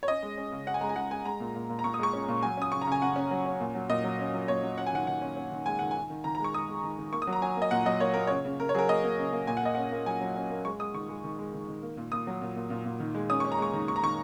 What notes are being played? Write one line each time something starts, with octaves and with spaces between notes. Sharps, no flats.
C#5
C#4 D#5
G#3
C#4
C#3
C#4 F#5
G#5
G#3 A#5
G#5
G#3 F#5
G#3 G#5
G#3 A#5
A#2
A#2
A#2
A#5
A#2 C#6
D#6
G#3 C#6
C#4
A#2
F#3 G#5
C#4 D#6
C#3 C#6
A#5
C#3
G#5
C#3 F#5
C#4
F#3
C#4
A#2
F#3
A#2 D#5
F#3
C#4
F#3
A#2 C#5
F#3
C#4 F#5
G#5
D#3 F#5
D#3 F#5
C#4
C#4
D#3
G#3 G#5
D#3 F#5
D#3 G#5
D#3
D#3 A#5
A#5
G#3 C#6
G#3 D#6
G#3
D#3
D#3
A#3 C#6
D#6
F#3
A#5
F#3 G#5
A#3
D#5
A#2 F#5
F#3 D#5
A#3 C#5
A#3 A#4
C#3 C#5
C#3
C#3 A#4
C#5
F#3 G#4 A#4
A#3 D#5
A#3
C#3
A#3
A#2 G#5
F#5
A#3 D#5
C#4 F#5
A#3
F#3 G#5
F#3
C#4
A#3
G#3 C#6
G#3 D#6
D#3 C#6
G#3
D#3
G#3
D#3
D#3
A#3
A#2
A#2 D#6
F#3
A#2
A#2
A#2
A#2
D#3
G#3
C#4 D#6
C#4 C#6
A#5
G#3 C#6
D#3
D#3 C#6
A#5
D#3 C#6